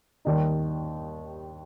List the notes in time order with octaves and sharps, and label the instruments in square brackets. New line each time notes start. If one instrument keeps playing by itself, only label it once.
[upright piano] D#2 D#3 G3 D#4